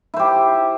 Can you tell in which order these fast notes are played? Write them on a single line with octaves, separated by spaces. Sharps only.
E4 C5 G4